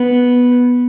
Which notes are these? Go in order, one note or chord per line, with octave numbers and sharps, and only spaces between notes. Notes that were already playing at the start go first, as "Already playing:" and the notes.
Already playing: B3